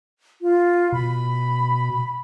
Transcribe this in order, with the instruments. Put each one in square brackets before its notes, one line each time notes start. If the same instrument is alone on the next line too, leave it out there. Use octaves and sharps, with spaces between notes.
[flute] F4
[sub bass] B2 [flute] B5